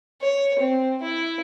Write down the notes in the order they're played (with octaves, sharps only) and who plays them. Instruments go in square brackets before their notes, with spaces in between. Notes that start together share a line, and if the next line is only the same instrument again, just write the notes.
[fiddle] C#5
C4
E4